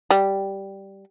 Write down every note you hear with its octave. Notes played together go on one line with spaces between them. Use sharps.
G3